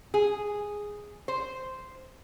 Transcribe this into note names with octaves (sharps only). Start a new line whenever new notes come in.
G#4
C5